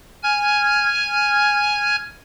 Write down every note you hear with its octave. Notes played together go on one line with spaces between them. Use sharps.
G#5 F6 G#6